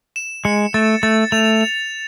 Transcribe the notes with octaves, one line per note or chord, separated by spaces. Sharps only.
E7
G#3 C#7
A3 A6
A3 A6
A3 F7
F7